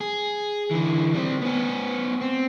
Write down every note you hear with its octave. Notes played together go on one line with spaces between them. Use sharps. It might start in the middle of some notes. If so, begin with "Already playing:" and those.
G#4
D3 E3
G3 C4
B3 C#4
C4